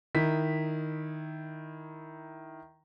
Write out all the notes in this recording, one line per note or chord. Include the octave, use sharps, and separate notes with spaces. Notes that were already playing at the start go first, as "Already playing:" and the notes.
D#3 E4 B6